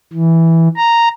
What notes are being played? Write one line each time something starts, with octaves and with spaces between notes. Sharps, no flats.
E3
A#5